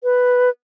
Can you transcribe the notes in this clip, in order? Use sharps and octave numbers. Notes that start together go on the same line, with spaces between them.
B4